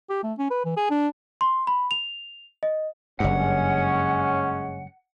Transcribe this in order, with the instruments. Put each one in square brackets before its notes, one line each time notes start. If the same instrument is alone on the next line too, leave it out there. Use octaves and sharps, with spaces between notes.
[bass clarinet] G4
A3
C#4
B4
E3
G#4
D4
[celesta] C6
B5
F7
D#5
[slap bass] F#1 G2 [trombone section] G#3 C#4 [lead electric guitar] F#5